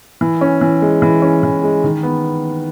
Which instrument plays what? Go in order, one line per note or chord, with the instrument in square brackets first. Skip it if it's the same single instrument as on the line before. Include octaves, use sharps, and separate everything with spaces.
[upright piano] E3
C#4
E3
G#3
E3
C#4
E3
G#3
D#3
B3